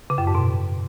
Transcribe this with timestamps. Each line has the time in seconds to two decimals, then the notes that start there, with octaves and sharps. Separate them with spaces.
0.10 C#3
0.18 F#2
0.27 G#2
0.35 B2